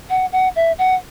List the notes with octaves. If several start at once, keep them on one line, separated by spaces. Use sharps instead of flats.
F#5
F#5
E5
F#5